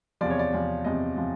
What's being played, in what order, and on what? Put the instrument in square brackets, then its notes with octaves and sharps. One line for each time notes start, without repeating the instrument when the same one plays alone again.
[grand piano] E2 C3 F3 D5
C#5
D5
E2 C3 F3
E2 C3 F3 D#5
C3 F3